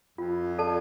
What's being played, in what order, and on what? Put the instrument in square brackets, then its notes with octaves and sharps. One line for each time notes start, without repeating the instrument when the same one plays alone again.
[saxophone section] F2 [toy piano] F4
[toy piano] A4 D5 A5